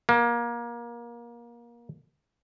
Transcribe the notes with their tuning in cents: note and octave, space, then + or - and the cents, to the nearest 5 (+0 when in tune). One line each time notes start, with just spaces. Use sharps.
A#3 +25